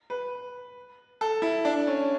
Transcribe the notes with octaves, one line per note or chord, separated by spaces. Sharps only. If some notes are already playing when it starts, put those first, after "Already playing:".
B4
A4
E4
D4
C#4